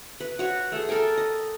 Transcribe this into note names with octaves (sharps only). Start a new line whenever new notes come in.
B4
F#4 C#5
A3 G#4
A4 A#4 G5 G#5
D#5